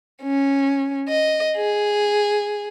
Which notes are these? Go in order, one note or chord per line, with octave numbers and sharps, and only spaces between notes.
C#4
D#5
G#4